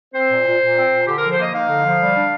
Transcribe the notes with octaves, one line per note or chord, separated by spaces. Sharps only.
C4 C5
A#2
A#2
A#2
C4
A#2
D3 G4
F3 A#4
C5
A#3 D#5
D#4 F5
D3
F3
G3
D4